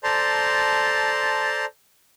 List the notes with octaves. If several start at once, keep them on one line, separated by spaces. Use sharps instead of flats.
A4 C5 D5 A5 A#5 C6